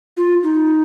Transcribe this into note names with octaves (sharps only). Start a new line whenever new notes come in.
F4
D#4